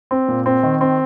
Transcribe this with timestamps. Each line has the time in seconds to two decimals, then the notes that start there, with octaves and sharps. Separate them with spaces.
0.11 C4
0.28 A#2
0.46 C4
0.63 D#3
0.81 C4